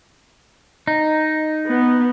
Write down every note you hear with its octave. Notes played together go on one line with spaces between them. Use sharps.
D#4
B3